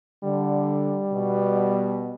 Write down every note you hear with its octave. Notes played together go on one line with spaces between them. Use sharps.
D3 G3
B2